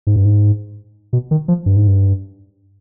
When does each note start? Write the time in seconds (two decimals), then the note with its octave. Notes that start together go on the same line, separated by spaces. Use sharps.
0.07 G#2
0.16 G2
0.25 G#2
1.13 B2
1.31 D#3
1.48 F3
1.66 G2
1.76 G#2
1.87 G2